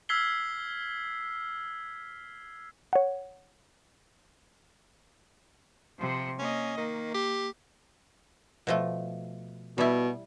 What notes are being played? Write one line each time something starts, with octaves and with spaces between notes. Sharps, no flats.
E6 F6 G#6 B6 C7 G7
C#5 F#5
C3 F3
A#3 C#4 D#5
D#3 A#3
G4
B2 F3 A3
B2 G3 E4